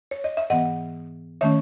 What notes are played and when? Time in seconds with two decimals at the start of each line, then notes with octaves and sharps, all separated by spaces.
0.11 C#5
0.24 D#5
0.37 E5
0.50 G#2 E3 B3 D#5 F#5
1.41 D#3 A3 C#4 C#5 E5